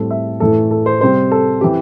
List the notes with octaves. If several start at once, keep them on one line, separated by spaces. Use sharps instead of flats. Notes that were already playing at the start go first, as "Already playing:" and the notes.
Already playing: A2 G3 C4 A4
E5
A2 E3 A3 A4
A4
C5
C3 G3 C4 C5
A4
E3 C4 G4